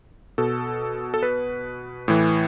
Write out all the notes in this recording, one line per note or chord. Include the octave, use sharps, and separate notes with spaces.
B2 A4
A4
B4
A2 E3